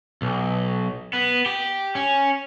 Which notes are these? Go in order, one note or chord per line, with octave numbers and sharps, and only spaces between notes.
B1
B3
G4
C#4